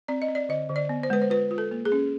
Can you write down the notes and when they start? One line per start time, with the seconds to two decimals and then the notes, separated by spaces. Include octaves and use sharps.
0.08 C4 D5
0.22 D#5
0.29 C4
0.35 D5
0.49 D3 D#5
0.69 D3
0.76 D5
0.89 B3
1.03 C5
1.10 G#3 B4
1.22 C5
1.30 F4 B4
1.51 F4
1.58 A4
1.71 A#3
1.85 G#4
1.92 C#4